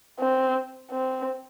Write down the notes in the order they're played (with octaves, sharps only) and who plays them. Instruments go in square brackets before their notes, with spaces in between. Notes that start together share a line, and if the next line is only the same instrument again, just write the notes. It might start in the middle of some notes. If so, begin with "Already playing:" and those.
[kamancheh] C4
C4